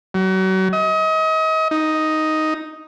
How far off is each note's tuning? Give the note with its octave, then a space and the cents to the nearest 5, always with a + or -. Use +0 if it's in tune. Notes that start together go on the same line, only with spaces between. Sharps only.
F#3 +35
D#5 +35
D#4 +5